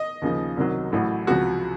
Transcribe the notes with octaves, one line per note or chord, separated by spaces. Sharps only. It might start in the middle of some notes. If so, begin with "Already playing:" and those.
Already playing: D#5
D#2 C#3 F3
C2 C3 D#3 F#3
A1 A2 F#3
C#2 C3 F3 F#4